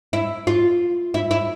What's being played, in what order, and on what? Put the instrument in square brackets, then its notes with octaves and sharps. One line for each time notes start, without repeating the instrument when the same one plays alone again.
[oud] E4
F4
E4
E4